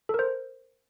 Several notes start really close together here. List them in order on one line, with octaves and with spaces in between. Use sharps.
A4 A#4 C5